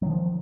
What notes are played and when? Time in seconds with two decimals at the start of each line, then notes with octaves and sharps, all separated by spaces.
0.02 F#3
0.06 D#3
0.10 F3